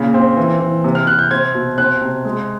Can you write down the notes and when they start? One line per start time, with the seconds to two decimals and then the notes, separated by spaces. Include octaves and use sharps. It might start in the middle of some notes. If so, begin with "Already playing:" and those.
Already playing: A#2 C#3
0.14 C4
0.37 E3
0.60 E3
0.84 C3
0.95 F6
1.07 C3 F#6
1.19 G6
1.31 C4 G#6
1.55 B2
1.78 C4 F#6
2.02 C3
2.25 G#3